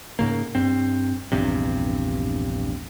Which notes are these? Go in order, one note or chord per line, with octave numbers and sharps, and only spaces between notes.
G#2 C#3 A#3
G2 C4
A#1 E2 G2 C3